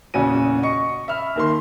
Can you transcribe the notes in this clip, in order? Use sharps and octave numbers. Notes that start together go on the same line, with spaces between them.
A#1 E2 C#3 C#4 F#4 D#7
D#5 C#6 C#7
E5 B5 F6
D#2 D#3 C6